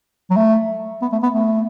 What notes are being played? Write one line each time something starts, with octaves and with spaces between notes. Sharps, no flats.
F#3
A3
B3
A3
B3
A3